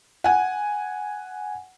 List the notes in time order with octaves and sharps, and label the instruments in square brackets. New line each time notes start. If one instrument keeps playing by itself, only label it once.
[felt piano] F#5 G#5